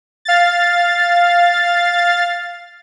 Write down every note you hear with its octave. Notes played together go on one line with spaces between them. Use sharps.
F5 A6